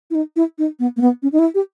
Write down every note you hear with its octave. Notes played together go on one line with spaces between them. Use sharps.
E4
D#4
E4
D#4
B3
A#3
B3
C#4
D#4
E4
G4